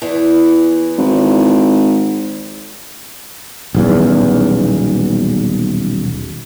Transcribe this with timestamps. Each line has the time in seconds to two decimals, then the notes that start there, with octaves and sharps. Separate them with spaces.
0.02 E2 E3
0.98 G#1
3.75 D#1 B1 E2